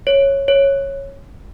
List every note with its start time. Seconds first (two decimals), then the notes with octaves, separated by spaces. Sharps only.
0.07 C#5
0.48 C#5